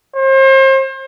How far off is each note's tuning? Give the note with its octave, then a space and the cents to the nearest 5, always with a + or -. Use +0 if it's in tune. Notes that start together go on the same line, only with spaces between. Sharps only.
C5 +35